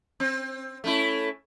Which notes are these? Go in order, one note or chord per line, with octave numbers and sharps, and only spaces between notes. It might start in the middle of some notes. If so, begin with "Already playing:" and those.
C4
A3 C#4 E4